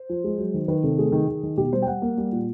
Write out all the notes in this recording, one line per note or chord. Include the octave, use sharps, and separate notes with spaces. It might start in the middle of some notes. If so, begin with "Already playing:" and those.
Already playing: C5
F3
G#3
F#3
D#3
D#3 B4
C3 A4
A3 G#4
D#3
D#3
D#3
B2 G4
G3 C5
G5
G3 F#5
A#3
G3
A#2